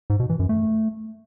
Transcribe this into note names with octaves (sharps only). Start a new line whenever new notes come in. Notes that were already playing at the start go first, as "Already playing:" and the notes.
G#2
B2
E3
F#2
A3